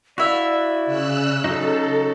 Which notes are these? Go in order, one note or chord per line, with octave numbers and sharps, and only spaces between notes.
E4 F#4 D5 E5 F5
C#3 E6 F#6
C#3 F#3 D#4 A4